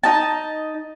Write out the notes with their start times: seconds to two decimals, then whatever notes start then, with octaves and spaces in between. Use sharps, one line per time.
0.04 D#4 D#5 A5